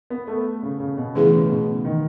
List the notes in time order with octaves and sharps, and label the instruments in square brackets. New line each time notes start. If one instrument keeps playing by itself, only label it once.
[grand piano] B3
A3
C#3
C#3
B2
[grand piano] C#3 [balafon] E3 A3 E4 G#4 B4
[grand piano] C#3
B2
D#3